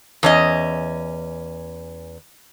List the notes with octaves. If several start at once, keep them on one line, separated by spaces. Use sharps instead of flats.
E2 C#4 D#5